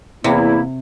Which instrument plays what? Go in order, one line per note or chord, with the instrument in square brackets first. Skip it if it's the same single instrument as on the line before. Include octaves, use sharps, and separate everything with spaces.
[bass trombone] E2 [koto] C3 [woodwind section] A#3 E4